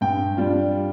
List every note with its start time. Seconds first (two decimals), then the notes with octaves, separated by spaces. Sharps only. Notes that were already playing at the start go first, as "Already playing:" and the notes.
0.01 G2 G5
0.37 G3 D4 F4